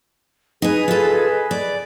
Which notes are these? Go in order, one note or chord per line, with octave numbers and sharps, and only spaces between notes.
D#4 G#4 B4 D#5 G#5
F4 A4
D5